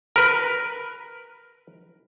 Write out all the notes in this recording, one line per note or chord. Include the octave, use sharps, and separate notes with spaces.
A#4 B4